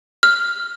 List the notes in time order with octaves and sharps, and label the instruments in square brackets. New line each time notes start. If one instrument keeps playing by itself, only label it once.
[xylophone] F6